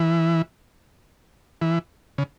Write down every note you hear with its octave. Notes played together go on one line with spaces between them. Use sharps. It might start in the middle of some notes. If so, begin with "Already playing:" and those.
Already playing: E3
E3
C#3